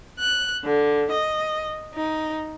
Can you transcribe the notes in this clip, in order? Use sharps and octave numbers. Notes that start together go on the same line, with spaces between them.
F#6
D3
D#5
D#4